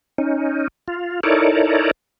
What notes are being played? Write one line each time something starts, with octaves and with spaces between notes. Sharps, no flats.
C#4 D#4
F4
D#4 E4 A4 A#4 C#5 D5